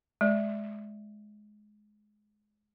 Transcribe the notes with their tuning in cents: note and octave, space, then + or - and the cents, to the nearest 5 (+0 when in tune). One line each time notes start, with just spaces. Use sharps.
G#3 +15 D5 +15